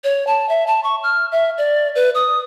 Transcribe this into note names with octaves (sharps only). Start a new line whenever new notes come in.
C#5
A5
E5
A5
C#6
F6
E5
D5
B4
D#6